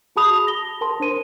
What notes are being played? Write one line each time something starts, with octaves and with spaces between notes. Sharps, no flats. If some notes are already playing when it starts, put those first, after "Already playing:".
F#4 G#4 A5 B5 D#6 F7
A#6 G7
A#4 A5 C6
D4 C5 D#7